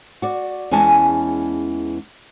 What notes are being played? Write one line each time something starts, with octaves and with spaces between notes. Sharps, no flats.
F#4 D5
E2 E3 G#3 C#4 G#5 A5